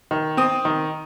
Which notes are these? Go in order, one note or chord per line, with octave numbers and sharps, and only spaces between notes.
D#3
C4 D#6
D#3